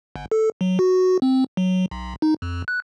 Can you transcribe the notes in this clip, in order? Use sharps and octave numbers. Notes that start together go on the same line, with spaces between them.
G1
A4
F#3
F#4
C4
F#3
B1
D#4
F2
F#6